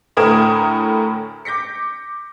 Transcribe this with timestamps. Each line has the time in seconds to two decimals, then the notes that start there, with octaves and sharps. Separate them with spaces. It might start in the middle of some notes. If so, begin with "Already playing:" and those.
0.17 D2 A2 A#4 D#6 G#6 E7
1.45 D6 G6 A#6 B6 C#7